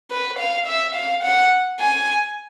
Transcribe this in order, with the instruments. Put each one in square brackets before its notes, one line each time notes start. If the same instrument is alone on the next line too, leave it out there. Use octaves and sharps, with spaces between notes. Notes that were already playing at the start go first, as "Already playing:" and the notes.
[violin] B4
F5
E5
F5
F#5
G#5